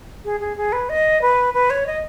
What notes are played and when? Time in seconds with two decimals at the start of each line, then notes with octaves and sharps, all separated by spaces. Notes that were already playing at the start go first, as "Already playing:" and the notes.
0.25 G#4
0.40 G#4
0.57 G#4
0.73 B4
0.89 D#5
1.22 B4
1.54 B4
1.70 C#5
1.87 D#5